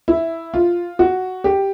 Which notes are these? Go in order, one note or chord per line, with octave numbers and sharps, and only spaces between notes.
E4
F4
F#4
G4